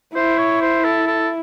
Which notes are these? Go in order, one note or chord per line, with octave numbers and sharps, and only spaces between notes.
E4 C5
C#5
C5
A4
A4